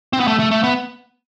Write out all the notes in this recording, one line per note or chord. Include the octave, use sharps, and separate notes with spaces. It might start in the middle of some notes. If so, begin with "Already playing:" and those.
C4
B3
A3
A3
A3
B3